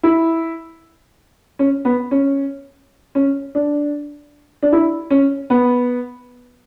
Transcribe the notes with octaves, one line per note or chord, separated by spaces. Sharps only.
E4
C#4
B3
C#4
C#4
D4
D4
E4
C#4
B3